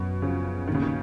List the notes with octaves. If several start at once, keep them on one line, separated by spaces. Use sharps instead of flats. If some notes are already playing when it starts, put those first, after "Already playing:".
Already playing: F#2 B2
C#3 F3
A#1 D#3
C#3
D#3